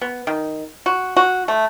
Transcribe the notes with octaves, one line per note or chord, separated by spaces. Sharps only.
B3
D#3
F#4
F#4
A3